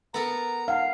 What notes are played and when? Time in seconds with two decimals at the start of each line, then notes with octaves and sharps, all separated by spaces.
0.14 B3 A4 A#4 A#5
0.68 D#4 F5 F#5